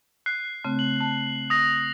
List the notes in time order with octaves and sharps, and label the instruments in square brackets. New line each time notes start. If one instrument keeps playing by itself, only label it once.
[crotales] F#6 C7
[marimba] C#3 A3 C4
[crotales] F#7
[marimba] A5
[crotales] D#6 A#6